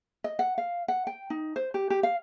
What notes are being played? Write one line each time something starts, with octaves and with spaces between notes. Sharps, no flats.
D#5
F#5
F5
F#5
G5
D#4
C5
G4
G4
F5